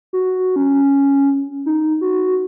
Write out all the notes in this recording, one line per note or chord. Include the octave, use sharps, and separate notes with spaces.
F#4
C#4
D#4
F#4